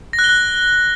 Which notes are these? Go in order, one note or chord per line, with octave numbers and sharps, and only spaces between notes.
A#6
F#6
G7
F#6